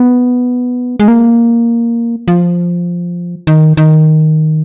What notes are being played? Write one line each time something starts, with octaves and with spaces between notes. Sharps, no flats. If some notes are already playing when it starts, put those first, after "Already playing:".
Already playing: B3
G#3
A#3
F3
D#3
D#3